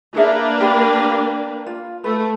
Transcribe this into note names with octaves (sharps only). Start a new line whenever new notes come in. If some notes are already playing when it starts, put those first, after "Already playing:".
A#3 D4 E4 G#4 B4 E5
G4 D5 B5
F4
A3 B4